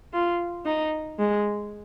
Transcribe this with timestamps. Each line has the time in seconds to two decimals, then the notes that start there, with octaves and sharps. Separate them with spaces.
0.14 F4
0.66 D#4
1.19 G#3